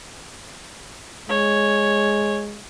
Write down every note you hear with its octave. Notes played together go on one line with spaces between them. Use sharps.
G#3 C#5